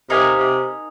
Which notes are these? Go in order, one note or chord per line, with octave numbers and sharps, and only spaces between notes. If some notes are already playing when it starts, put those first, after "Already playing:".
C3 D#4 A#4 F5 G#5
C3